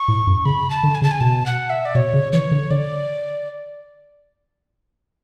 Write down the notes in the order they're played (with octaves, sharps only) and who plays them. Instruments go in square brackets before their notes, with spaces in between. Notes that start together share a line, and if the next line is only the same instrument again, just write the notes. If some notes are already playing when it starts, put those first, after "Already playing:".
Already playing: [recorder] C#6
[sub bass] A2
F#2
[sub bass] C#3 [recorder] B5
[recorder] A5
[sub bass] D3
[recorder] G#5
[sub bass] C#3 [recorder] A5
[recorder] G#5
[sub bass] B2 [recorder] A5
[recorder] F#5
E5
D5
[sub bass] B2 [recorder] C#5
[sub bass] C#3
[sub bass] E3 [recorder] C#5
[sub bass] D3
[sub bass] D3 [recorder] D5